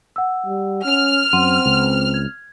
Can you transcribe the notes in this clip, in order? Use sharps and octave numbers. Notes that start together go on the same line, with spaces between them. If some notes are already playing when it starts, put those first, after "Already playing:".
F#5 E6
G3
C#4 F6
F#2 C4 F#5 C6 D#7
C#2
G#6